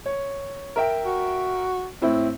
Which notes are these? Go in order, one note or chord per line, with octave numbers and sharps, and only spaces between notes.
C#5
A#4 E5 G5
F#4
A2 C4 E4